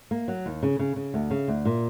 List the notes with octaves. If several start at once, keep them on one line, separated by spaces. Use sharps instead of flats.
A#3
F#3
D#2
C#3
C#3
C#3
D2
C#3
D2
A#2